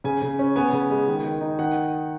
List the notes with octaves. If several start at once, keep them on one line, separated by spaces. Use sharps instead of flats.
C#3 G#5
C#3
C#4
B3 G#5
C#3
G#3
D#3
D#3
D#4
D#3 F#5